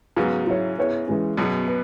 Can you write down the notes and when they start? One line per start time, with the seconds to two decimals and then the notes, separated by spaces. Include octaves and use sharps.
0.17 G#2 C#3 F#3 B3 F#4
0.47 F#3 E4 C#5
0.78 B3 E4 G#4 C#5
1.08 E3 G#3 C#4
1.37 F#2 B2 F#3 B3 G#4 B4
1.68 B4